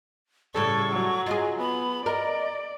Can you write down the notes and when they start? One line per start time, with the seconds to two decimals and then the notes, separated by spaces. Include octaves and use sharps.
0.54 A2 C#3 G3 A4 C#6
0.93 F#3
1.26 F4 G#4 D#5
1.59 B3 B5
2.06 A#4 D5 D#5